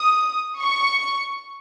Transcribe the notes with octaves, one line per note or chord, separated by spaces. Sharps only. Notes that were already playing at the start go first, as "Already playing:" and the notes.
Already playing: D#6
C#6